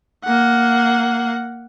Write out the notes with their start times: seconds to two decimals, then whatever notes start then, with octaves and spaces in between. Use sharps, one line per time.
0.24 A#3 F#5